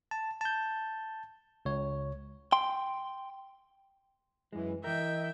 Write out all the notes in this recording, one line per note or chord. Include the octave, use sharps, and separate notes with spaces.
A5
A5 G6
C#2 C#5
G5 C6
F#2 E3 G#3
E3 A#4 D#5 E5 G5